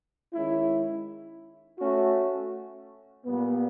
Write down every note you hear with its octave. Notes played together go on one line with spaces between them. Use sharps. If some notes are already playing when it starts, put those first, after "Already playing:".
D#3 G#3 C#4 E4
A3 C#4 F#4
A#2 G3 B3